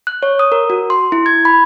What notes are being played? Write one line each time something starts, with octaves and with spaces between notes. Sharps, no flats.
F#6
C#5
D#6
A#4
F#4
C6
E4
G#6
B5